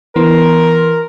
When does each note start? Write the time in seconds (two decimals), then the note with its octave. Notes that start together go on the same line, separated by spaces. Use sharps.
0.16 E3 B3 A#4 C6